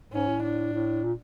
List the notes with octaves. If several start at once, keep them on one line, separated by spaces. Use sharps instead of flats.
G#2 C#4
A2
D4
A2
A#2